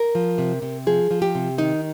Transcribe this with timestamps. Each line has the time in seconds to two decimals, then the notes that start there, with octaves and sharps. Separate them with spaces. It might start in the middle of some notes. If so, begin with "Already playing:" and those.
Already playing: A#4
0.15 F3
0.38 C3
0.62 C3
0.87 F3 G#4
1.11 F3
1.22 G4
1.35 C3
1.58 D#3 D#4